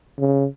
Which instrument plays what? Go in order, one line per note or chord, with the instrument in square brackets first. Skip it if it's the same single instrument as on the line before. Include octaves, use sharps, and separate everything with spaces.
[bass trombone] C#3